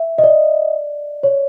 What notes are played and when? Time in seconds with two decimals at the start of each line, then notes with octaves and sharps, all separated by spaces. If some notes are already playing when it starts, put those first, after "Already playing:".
Already playing: E5
0.18 D#5
0.24 D5
1.23 C#5